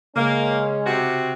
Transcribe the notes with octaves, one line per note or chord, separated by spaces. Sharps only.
C#3 G#3 A#3 C#4
C3 F#4